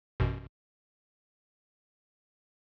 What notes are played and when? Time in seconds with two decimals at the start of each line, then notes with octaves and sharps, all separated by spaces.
0.20 A1 F#2 B2